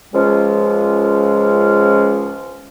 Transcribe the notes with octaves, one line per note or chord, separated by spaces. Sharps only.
C#2 F3 G#3 C#4